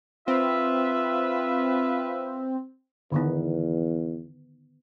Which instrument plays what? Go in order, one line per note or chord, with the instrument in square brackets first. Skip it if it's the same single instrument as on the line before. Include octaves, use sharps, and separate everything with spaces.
[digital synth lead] C4 [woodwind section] F4 B4 E5
[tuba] E2 [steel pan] D3 D#3 B3